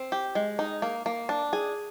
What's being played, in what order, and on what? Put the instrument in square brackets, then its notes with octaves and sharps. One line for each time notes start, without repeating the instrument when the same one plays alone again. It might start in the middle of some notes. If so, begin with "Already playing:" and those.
Already playing: [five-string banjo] C4
G4
G#3
D#4
A#3
A#3
D4
G#4